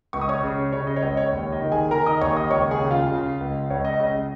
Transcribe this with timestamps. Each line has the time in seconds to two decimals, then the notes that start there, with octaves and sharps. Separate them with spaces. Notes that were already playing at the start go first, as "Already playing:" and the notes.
0.13 C#2 C#6
0.21 D#6
0.29 C#5 C#6
0.43 C#3
0.73 C#3 C#5
0.87 D#5
0.96 C#5
1.02 C#2 D#5
1.17 C#5
1.32 D#2
1.52 D#5
1.62 D#3
1.72 G#4 G#5
1.91 D#3 A#4 A#5
2.06 D#5 D#6
2.21 D#2 C#5 C#6
2.37 D#5 D#6
2.50 C#2 C#5 C#6
2.71 G#4 G#5
2.80 C#3
2.91 F4 F5
3.10 C#3
3.40 C#2
3.70 C#2 C#5
3.85 D#5
3.99 C#3 D#5